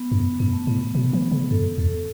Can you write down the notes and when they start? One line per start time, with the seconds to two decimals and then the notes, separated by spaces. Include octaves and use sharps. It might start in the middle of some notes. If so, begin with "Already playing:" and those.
Already playing: B3
0.12 F#2
0.39 F#2 B3
0.53 A3
0.67 A2 B3
0.81 B3
0.95 B2 B3
1.13 E3
1.31 C#3
1.50 F#2 A4
1.78 E2 A4